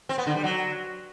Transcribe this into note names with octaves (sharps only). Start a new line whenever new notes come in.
C4
B3
D3
G3
F#3